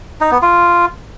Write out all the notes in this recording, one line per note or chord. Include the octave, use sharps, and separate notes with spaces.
D#4
B3
F4